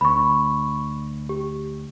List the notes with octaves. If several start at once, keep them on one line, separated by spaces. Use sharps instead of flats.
D2 B5 C#6
G4